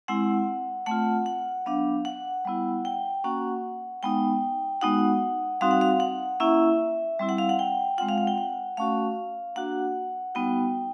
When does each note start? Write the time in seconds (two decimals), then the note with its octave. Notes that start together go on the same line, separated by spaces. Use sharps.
0.08 G#3 C4 E4 F#5
0.86 A3 C4 F4 F#5
1.26 F#5
1.66 F#3 B3 D4 F5
2.05 F#5
2.45 G3 B3 E4
2.85 G5
3.24 A#3 C#4 F#4 F#5
4.03 G#3 B3 D#4 G5
4.81 G#3 B3 D#4 F#4 F#5
5.61 G3 C4 D#4 F#4 F5
5.71 F#5
5.81 F5
6.00 F#5
6.40 A#3 C#4 E4 E5
7.19 G3 C4 E4
7.29 F#5
7.38 F5
7.49 F#5
7.59 G5
7.98 G#3 C4 F4 F#5
8.09 F5
8.18 F#5
8.27 G5
8.38 F#5
8.77 A3 C#4 F#4 F5
9.56 A#3 D4 F#4 F#5
10.35 G3 B3 D#4 F#4 G5